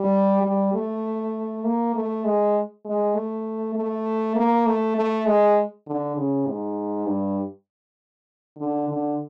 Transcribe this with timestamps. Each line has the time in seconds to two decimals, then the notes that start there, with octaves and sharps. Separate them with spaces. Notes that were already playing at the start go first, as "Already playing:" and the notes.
Already playing: G3
0.43 G3
0.74 A3
1.64 A#3
1.94 A3
2.25 G#3
2.85 G#3
3.15 A3
3.75 A3
4.36 A#3
4.66 A3
4.96 A3
5.26 G#3
5.87 D3
6.17 C#3
6.47 G#2
7.06 G2
8.57 D3
8.88 D3